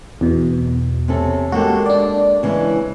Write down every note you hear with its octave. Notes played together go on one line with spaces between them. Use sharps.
E2 B2
C3 C#4 A4
G#3 A#3 F#4 G4 A4
D4 D5
C#3 E3 G#3